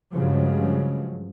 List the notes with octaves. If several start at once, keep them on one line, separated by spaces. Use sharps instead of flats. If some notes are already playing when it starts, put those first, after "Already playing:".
G2 C#3 F3 F#3 G#3